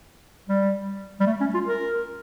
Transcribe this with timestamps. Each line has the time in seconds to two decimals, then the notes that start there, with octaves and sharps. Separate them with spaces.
0.49 G3
1.20 G3
1.27 A3
1.41 C#4
1.54 F4
1.67 A#4